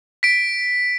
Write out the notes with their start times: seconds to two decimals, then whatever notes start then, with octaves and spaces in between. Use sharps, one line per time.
0.23 B6 D7